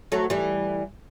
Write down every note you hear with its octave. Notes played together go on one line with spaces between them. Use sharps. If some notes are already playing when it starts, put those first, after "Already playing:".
F#3 A3
E3 G3